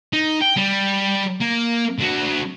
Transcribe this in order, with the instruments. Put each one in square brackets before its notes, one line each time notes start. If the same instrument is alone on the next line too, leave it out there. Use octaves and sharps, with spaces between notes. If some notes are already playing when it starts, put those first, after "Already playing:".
[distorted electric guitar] D#4
G5
G3
A#3
D3 F#4